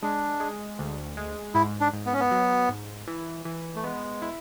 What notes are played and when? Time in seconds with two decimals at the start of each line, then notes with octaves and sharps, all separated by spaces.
0.03 G#3 D4
0.40 G#3
0.79 D2
1.17 G#3
1.55 G#2 E4
1.80 D4
1.93 G#2
2.06 B3
2.13 C#4
2.20 B3
2.31 F#3
2.69 G#2
3.07 E3
3.45 E3
3.76 A3
3.84 G#3 B3
4.22 E4